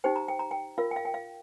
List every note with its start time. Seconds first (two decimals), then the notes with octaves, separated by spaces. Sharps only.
0.04 D#4 G4 C5 G5
0.16 A#5
0.28 G5
0.39 A#5
0.51 G5
0.78 F4 A#4 F5
0.91 G5
0.96 F5
1.05 G5
1.14 F5